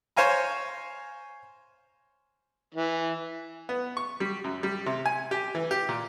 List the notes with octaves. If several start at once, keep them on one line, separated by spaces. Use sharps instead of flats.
C5 C#5 F5 G#5 A#5
E3
B3
C#6
G3
F#2
G3
C3
G#5
G4
E3
G4
A#2